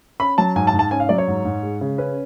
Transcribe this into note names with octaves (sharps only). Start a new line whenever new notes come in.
C#4 B5
F#3 A5
G#2 G#5
A5
G#2
A5
C#4 G#5
F5
F#3 D5
C#5
G#2
G#2
G#3
C#3
C#4 B4